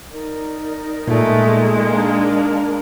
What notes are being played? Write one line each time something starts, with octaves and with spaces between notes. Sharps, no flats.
D#4 A#4 D5
A#2 G#3 A3
A#3 D4